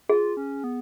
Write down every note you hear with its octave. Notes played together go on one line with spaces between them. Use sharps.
F4 G#4
C#4
B3